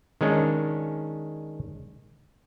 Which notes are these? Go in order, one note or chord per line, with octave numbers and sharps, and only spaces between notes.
D#3 G#3 C#4 D4